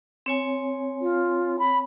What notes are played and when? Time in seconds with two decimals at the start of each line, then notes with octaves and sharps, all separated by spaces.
0.26 C4 C#5 G#5
1.02 F4
1.59 B5